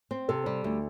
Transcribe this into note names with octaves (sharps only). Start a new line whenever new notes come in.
C4
C3 A4
G3
D2